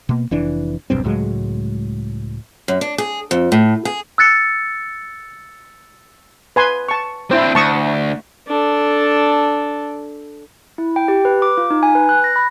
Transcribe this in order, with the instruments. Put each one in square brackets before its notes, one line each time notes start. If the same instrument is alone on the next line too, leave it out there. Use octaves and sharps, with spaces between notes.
[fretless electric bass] B2 A#3
F1 E3 D4
E1 B1 G2 C4
C#2 A2 F#3 G#3
[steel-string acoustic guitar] F#2
D4
G#4
F2
A2
G#4
[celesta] E6 F#6 A6 C#7
[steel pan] B4 G#5 C6
A5 C#6
[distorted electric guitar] C4 D4 [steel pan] E4 C5
[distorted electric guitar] D2 [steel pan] A5 C#6 D#6
[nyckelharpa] D4 A4
[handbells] E4
G5
G4
B4
D6
F4
D#4
G#5
B4
F#6
A#6
B5